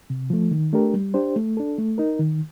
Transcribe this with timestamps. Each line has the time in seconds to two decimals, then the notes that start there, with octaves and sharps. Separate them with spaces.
0.10 C3
0.30 F3 A3
0.51 D#3
0.73 A3 D4 G4 A#4
0.94 G3
1.14 D4 G4 C5
1.36 A3
1.57 D4 A4
1.78 A3
1.98 D#4 A#4
2.19 D#3